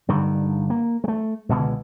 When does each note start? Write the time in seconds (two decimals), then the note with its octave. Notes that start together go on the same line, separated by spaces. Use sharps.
0.08 G2 D3 D#3
0.70 A#3
1.04 G#3 A3
1.49 C#2 B2 D3 G#3